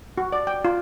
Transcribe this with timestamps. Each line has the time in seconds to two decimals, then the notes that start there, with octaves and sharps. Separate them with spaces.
0.18 F#4
0.32 D5
0.47 G5
0.65 F4